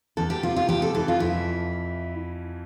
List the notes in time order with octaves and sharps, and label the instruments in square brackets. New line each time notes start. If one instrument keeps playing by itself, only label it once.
[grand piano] E2 [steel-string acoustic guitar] A4
[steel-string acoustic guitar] G4
[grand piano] C3 [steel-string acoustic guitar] F4
[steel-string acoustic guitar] F4
[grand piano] E2 [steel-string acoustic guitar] G4
[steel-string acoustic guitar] A4
[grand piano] E3 [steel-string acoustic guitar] A4
[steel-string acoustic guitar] F4
[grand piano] F2 [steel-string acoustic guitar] E4